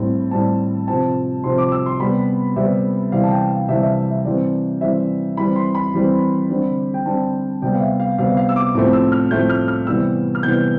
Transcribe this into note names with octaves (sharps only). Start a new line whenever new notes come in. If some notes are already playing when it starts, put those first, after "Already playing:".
Already playing: A2 G3 C4
A2 G3 C4 A5
C3 F3 C4 A5
C3 F3 C4 C6
D6
E6
C6
C3 G3 B3 B5
C3 G3 B3 E5
C3 E3 G3 F5
A5
G5
F5
C3 E3 G3 E5
E5
E5
E3 G3 C4 D5
E3 G3 C4 E5
E3 G3 C4 B5
C6
B5
E3 G3 C4
D3 G3 C4
G5
D3 G3 C4 A5
C3 G3 B3 G5
F5
E5
F5
C3 G3 B3 F5
F5
E6
D6
A2 F3 A3 C4 D6
E6
F6
A2 F3 A3 C4 G6
F6
F6
C3 E3 G3 B3 E6
F6
C3 E3 G3 B3 G6